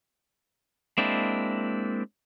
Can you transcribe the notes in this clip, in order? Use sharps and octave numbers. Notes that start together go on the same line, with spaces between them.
G#3 A#3 C4 D4 E4